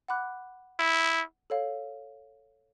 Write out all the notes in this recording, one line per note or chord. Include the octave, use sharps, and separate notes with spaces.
F#5 B5 D6 F#6
E4
A4 C#5 F5